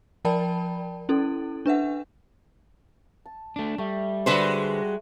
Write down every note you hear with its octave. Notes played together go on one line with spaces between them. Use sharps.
F3 A#4 D5 G5 A5 B5
C#4 E4 A4
D4 B4 E5 F#5
A5
A3 D4
G3 A3
D3 G#3 F#4 B4 C5